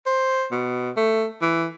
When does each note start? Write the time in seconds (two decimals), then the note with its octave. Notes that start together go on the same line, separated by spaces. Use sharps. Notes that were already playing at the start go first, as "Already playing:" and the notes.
0.06 C5
0.52 B2
0.97 A3
1.42 E3